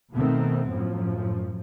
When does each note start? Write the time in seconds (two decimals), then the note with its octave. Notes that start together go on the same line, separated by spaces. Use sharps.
0.15 B2 D#3 A3 B3 C4
0.70 F#2 A2 F3